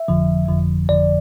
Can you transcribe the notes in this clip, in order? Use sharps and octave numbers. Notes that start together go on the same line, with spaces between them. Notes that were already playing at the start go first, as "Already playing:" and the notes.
Already playing: E5
G1 F2 D3 F3
G1 F2 D3 F3
G1 F2 D3 F3 D5